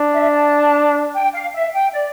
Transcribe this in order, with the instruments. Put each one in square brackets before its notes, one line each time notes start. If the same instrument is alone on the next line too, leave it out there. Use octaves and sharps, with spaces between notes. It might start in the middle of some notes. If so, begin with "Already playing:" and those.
Already playing: [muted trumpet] D4
[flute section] E5
A5
G5
F5
E5
G5
D5